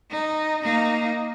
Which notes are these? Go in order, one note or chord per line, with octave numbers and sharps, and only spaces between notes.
D#4
A#3 D#4